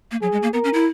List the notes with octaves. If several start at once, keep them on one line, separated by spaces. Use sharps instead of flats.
A#3
F#3 G#4
G#3
A#3
B3 A#4
C#4
E4